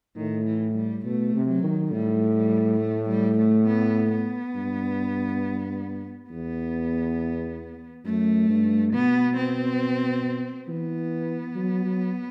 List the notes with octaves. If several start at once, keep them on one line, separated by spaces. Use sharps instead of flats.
A2 D#3
E3
G3
B2 A3
C3
F#3
D#3
A2 G3
G3
A3
G3
A3
B3
B3
G2
E2 B3
F#2 A3
G2
B2 B3
C4
E3 B3
F#3
F#3